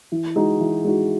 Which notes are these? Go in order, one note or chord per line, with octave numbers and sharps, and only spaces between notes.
E3
G#3 D#4 F#4
E3
G#3 D#4 F#4